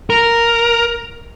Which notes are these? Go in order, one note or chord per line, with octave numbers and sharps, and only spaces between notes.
A#4